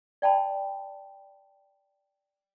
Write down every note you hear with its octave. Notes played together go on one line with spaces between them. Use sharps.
D5 G5 A5 B5